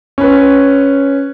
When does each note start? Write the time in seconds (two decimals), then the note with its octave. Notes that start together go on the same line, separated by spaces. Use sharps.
0.18 C#4 B4